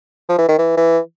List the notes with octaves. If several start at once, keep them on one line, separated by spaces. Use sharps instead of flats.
F3
E3
D#3
E3
E3